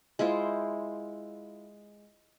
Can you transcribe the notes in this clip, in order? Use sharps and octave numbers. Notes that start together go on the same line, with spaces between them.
G#3 E4 F4 C5